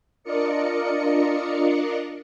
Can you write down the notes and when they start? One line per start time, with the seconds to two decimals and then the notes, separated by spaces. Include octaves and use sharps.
0.23 D4 F4 A#4 D5 D#5 C#7